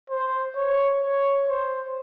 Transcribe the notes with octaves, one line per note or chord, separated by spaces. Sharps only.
C5
C#5
C#5
C5